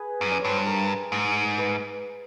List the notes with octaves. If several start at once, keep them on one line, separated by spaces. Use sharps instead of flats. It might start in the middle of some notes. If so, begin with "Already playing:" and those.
Already playing: G#4 B4
F#2
D5
C#5
G2 C5
B4
A#4
G#2
B4
B4